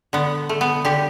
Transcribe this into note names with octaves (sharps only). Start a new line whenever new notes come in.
D3 B3
A3
B3
D3 G4